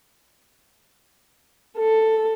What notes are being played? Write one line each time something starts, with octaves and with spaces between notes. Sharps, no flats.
A4